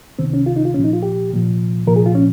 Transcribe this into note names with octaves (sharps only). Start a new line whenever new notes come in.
C#2 C3 D#3 C4
C#4
F4
D#4
F4
C2 A#2 F3 C#4
D#4
F4
G4
C2 A#2 F3
C2 A#2 F3 A#4
G#4
F4
C#4